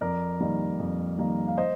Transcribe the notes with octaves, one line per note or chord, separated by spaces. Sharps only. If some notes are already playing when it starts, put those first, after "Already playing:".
F2 A#4 D5
D#3 G3 A#3
F2
D#3 G3 A#3
F5
C5 D#5